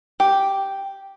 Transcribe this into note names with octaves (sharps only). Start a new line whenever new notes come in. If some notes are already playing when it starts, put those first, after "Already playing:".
G4